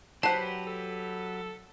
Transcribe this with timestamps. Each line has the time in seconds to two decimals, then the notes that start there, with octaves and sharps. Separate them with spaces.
0.23 F#3 G4 B4 C5 F#5 A5
0.67 A4